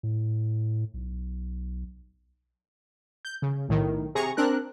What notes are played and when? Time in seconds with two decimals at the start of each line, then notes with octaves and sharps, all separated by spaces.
0.03 A2
0.94 B1
3.25 G6
3.42 C#3
3.69 B1 A2 D#3
4.15 C3 G#4 A#5 C#6
4.37 C4 D4 A#4 F#6